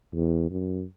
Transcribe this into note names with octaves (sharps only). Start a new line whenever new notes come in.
E2
F#2